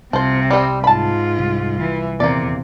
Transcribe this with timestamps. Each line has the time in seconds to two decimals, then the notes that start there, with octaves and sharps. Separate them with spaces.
0.13 C2 C3 F3 C5
0.50 G3 C4
0.84 G#2 F4 A5 B5
1.39 C2
1.81 E3
2.20 D#1 E2 C3 A#3 D5